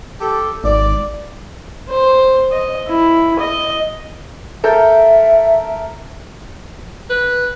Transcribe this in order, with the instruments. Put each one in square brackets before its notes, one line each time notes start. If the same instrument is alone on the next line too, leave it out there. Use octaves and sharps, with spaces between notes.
[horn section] G4 A4
[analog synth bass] G#1 [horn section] D5
[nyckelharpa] C5
D#5
E4
D#5
[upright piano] A4 A#4 G6 [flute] E5
[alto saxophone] B4